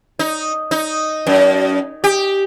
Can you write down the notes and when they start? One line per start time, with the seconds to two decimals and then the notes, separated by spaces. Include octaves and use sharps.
0.19 D#4
0.71 D#4
1.27 F#2
2.04 G4